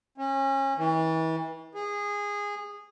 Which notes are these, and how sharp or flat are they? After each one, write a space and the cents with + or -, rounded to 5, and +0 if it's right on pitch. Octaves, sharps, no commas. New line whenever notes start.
C#4 -30
E3 -35
G#4 -20